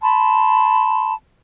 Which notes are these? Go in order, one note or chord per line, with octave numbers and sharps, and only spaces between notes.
A5 B5 C6